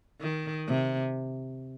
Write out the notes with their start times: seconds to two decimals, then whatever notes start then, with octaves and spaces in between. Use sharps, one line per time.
0.21 D#3
0.67 C3